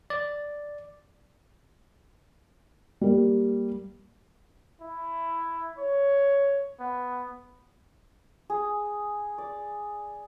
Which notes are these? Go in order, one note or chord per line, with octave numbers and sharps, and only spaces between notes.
D5
G3 A#3
E4
C#5
B3
G#4
D5